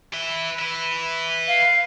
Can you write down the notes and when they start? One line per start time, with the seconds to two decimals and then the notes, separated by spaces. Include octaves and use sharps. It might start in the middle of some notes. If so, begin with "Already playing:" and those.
0.14 B4 E5
0.59 B4 E5
1.48 F5